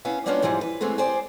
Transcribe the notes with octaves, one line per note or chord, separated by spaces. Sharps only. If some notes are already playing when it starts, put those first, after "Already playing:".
B3 C#4 E4 F5
G3 A#3 B3 C#4 D4 F4
G#2 E3 F3 G3 G#3
B4
E3 G#3 A3 B3 C4
G4 G#4 C5 D5